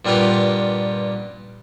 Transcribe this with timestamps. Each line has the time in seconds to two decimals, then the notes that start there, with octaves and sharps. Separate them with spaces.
0.05 G2 A#2 G3 B3 F4 G4